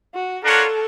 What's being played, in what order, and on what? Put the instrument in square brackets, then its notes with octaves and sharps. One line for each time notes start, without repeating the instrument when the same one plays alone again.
[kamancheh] F#4
[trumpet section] D4 F4 A#4 C#5 F#5 [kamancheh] A4